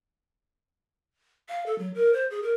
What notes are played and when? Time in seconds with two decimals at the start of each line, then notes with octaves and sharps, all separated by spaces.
1.49 F5
1.66 A4
1.79 F#3
1.95 A#4
2.13 C5
2.30 G#4
2.43 A#4